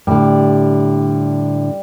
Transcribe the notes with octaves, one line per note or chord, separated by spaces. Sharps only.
A2 D3 G3